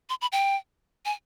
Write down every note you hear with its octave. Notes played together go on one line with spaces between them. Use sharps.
C6
B5
G5
G#5